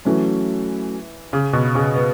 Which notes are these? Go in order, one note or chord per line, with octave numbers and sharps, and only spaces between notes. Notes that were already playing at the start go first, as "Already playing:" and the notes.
E3 F#3 A3 C#4
C#3
B2
C#3
B3